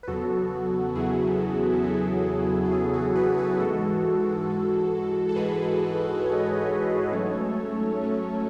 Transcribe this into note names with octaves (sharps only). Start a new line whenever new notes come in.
B4
E2 C#3 F#3 B3 F#4 A4
E2 C#3 F#3 B3 E4 G#4
E4
E2 C#3 F#3 B3 F#4
A4
E2 C#3 F#3 B3 E4 G#4
F#4 A4
G#4 B4
G#4 B4
G#2 E3 G#3 F#4 A4
G#2 E3 G#3
A4
G#2 E3 G#3 G#4 B4
G#2 E3 G#3 C#5
D#5
A4 C#5
G#2 F#3 A3 C#4
G#2 F#3 A3 C#4